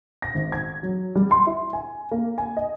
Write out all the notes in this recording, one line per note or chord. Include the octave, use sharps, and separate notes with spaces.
A#6
G#1
G#6
F#3
G3
C6
E4
G#5
A#3
G#5
D#5